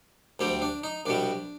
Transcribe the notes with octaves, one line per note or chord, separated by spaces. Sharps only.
D2 D3 G3 C4
D4
D#4
C2 B2 G3 D4